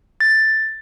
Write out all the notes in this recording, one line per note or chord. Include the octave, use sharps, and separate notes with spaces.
A6